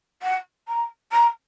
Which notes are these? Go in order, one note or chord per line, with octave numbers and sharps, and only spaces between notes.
F#5
A#5
A#5